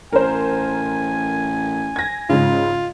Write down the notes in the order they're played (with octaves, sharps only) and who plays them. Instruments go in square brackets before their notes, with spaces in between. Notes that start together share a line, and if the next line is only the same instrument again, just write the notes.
[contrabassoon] A1 [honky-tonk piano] A#4 C5 [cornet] G#5
[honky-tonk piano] G#6 A#6
[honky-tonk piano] G#2 C#3 [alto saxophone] F4